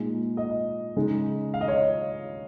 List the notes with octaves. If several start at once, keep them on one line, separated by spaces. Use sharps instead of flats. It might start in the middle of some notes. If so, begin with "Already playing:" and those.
Already playing: A#2 G#3 D#4
D#5
C#3 G#3 D#4
F5
D#5
C#5